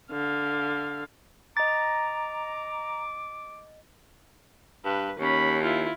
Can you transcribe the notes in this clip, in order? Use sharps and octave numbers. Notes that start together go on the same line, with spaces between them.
D3 F5
D#5 A#5 D6 A6
G2 B4
D#2 C#4 B5
E4 F4